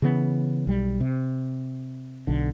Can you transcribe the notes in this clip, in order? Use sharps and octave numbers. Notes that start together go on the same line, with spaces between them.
C#3 E3 B3
B1 G3
C3
B1 D3